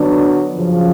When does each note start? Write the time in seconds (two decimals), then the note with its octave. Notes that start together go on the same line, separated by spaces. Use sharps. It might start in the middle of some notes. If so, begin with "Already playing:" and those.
Already playing: D3 F#3 B3 D4
0.55 F#2 C#3 F3